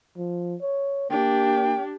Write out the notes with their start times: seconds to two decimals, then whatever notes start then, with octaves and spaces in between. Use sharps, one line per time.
0.17 F3
0.61 C#5
1.10 A#3 D4 G4 G5